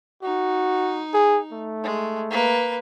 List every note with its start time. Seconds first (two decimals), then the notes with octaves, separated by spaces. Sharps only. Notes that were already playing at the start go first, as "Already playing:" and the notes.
0.23 D#4 F#4
1.14 G#4
1.52 A3
1.84 G#3
2.31 A#3 B4